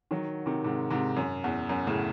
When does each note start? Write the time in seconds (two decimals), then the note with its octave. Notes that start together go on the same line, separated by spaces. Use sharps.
0.11 D#3 F#3
0.46 C3 D#3
0.64 G#2 C3
0.90 G#2 C3
1.16 F#2
1.44 E2
1.69 F#2
1.87 A2 C#3